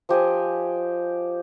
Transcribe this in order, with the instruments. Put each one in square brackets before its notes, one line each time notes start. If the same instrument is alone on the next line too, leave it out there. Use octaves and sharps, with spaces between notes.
[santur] F3 G4 D#5 G#5